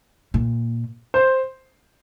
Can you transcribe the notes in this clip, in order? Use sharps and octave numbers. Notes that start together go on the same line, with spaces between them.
A#2
C5